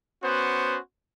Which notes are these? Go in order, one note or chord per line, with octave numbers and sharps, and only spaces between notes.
B3 C#4 F#4 C5